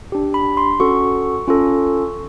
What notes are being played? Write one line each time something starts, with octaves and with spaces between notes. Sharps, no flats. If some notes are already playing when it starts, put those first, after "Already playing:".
D4 G4
B5
C6
C#4 F#4 A4 C#6
C#4 F4 A4